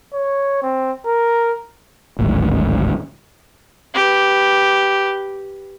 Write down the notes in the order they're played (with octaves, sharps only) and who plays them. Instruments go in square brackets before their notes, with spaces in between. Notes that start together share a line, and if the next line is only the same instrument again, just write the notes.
[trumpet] C#5
C4
A#4
[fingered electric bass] D1 G#1 D2 G#2
[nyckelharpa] G4 B4